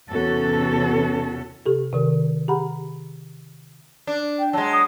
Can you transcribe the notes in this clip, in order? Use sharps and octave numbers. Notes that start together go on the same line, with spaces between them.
E2 C3 C#4 F#4 A4
C3 G4 A4
C3 D#3 A#4
G4 G#4 F#5 A#5 B5
D4
G5
F#3 G#3 A5
D#6